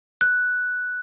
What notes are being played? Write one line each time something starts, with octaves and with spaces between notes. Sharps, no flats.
F#6